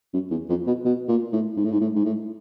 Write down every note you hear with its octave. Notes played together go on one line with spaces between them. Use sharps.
F#2
E2
F2
B2
B2
A#2
A2
G#2
A2
G#2
A2
G#2
A2